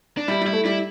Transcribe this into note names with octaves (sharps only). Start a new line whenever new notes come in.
D4
G3 E4
G3
E4
A3
G3 E4